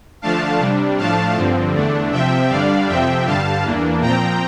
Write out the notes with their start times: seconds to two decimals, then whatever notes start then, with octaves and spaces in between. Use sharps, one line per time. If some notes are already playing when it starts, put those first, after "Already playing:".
0.22 D3 F3 A3 D4 F5 A5
0.60 C3 G3 D4
0.98 A2 F3 A3 D4 F5 A5
1.36 G2 D3 F3 C4
1.74 E2 D3 A3 D4
2.12 C3 F3 C4 E5 G5
2.49 G2 D3 G3 D4 D5 F5
2.88 F2 C3 F3 C4 E5 G5
3.26 G2 D3 G3 F5 A5
3.64 E2 E3 A#3 D4
4.01 A#2 F3 C4 G5 A#5